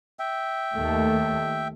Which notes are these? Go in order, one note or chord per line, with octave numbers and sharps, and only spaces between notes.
E5 G5
D#2 A3